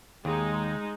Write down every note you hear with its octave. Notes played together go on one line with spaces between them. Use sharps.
D#2 G#3 D#4